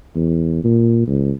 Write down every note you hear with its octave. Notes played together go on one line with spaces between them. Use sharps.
E2
A#2
C#2